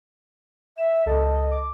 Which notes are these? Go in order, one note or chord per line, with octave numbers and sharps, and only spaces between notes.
E5 E7
C#2 A4 D#5 A5
D6